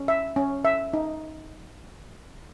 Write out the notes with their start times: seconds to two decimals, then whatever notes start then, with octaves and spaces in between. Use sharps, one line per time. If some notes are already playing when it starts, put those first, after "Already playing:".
Already playing: C#4
0.08 E5
0.36 C#4
0.65 E5
0.93 D#4